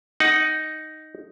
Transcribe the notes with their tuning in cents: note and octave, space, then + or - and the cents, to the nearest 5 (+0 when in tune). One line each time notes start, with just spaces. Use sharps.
D#4 +0 F#5 +10